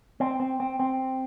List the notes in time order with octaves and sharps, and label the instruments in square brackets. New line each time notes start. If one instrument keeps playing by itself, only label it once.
[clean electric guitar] C4
C4
C4
C4